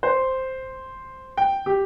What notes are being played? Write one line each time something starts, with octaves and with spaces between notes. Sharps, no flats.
C5
G5
G4